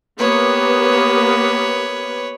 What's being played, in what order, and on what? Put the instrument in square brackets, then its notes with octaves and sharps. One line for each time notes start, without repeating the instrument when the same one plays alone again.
[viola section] A#3 B3 G4 [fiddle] B4 C#5